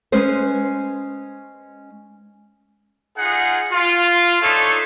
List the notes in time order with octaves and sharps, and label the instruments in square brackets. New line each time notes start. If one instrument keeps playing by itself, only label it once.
[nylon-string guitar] G#3 C#4 B4 C5
[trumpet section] D#4 F4 G#4 F#5
F4
D4 D#4 A4 C#5 E5 C6